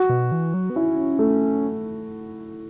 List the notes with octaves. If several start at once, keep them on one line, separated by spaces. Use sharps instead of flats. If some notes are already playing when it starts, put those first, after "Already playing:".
Already playing: F#4
B2
E3
F#3
B3
C#4 E4
A3